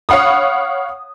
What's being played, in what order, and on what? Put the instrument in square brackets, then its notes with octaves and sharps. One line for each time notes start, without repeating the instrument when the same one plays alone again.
[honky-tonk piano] C#5 F5 F#5 B5 D#6